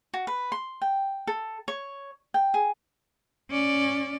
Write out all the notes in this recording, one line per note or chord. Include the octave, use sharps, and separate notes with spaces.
F#4
B4
C6
G5
A4
C#5
G5
G#4
C#4 D5